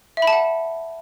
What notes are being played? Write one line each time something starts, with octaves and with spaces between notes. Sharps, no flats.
E5
B5
A5
F#5